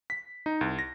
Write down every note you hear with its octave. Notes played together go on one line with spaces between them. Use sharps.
B6
D#4
C2
A#6